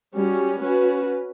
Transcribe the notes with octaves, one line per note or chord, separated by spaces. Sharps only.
G3 C#4 F#4
C#4 F#4 B4